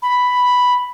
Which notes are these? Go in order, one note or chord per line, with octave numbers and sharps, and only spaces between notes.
B5